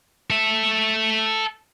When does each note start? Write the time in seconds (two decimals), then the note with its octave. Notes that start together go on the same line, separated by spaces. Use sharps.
0.30 A4 E5